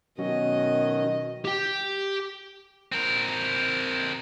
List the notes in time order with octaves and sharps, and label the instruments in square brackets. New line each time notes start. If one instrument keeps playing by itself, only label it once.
[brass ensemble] B2 D#3 [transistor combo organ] F#3 C#4 [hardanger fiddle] D#5
[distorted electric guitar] G4 G5
C4 A#4